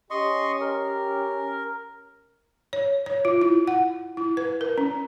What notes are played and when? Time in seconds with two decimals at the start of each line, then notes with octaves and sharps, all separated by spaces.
0.10 C#4 G4 D#5 C6 C#6
0.61 A#4
2.73 C#5
3.06 C#5
3.25 F4
3.41 E4
3.68 F#5
4.17 E4
4.37 B4
4.61 A#4
4.78 C#4